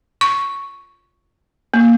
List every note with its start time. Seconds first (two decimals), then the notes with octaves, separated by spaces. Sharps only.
0.21 C#6
1.74 A#3